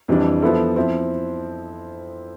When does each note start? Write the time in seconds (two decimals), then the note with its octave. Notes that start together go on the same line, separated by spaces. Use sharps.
0.08 F2 E3 G3 D4
0.42 F3 B3 E4 A4
0.76 F3 C4 E4